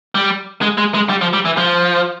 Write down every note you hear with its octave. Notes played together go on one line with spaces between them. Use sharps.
G3
G#3
G#3
G#3
G3
F3
G3
E3
F3